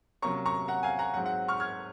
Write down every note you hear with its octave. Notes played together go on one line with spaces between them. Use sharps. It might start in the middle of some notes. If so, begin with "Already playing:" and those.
C3 F#3 A#3 C#4 A#5 C#6
A#5 C#6
F#5 A#5
F5 G#5
F#5 A#5
G#2 F#3 C4 F#5
F#5
C#6 F6
F6 G#6